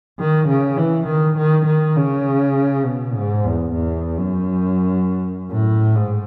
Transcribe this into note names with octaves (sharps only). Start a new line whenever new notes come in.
D#3
C#3
E3
D#3
D#3
D#3
C#3
B2
G#2
E2
E2
F#2
A2
G#2